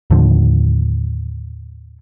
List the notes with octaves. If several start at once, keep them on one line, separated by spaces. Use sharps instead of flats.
D#2 A2 D3 F3